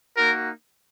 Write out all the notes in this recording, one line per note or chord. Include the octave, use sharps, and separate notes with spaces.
A#3 D#4 F#4 A#4